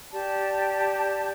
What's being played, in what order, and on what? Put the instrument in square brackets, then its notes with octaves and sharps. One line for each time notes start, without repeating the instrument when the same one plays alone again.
[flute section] G4 D5 A5